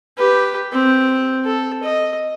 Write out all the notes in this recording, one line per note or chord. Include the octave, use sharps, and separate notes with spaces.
G4 B4
C4
A4
D#5